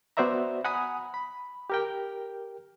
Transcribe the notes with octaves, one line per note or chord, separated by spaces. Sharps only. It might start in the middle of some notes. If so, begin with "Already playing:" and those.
B3 F#4 C5 D5 E5 A#5
F#5 G#5 A#5 B5 D#6
B5
G4 A#4 G5